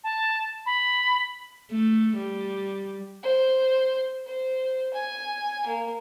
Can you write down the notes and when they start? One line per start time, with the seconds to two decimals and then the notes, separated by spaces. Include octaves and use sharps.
0.04 A5
0.66 B5
1.71 A3
2.17 G3
3.23 C5
4.26 C5
4.93 G#5
5.67 A#3